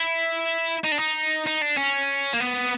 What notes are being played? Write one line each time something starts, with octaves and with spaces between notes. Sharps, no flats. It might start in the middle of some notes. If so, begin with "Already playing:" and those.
Already playing: E4
D#4
D4
D#4
D#4
D4
C#4
A#3
B3